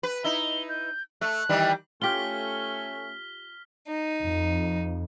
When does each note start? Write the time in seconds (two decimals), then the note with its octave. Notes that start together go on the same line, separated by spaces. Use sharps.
0.03 B4
0.24 D#4 E4 G7
0.69 G6
1.21 A3 F#6
1.49 D#3 E3 G3
2.02 A3 C#4 F4 G4 F6 B6 G7
3.88 D#4
4.23 F2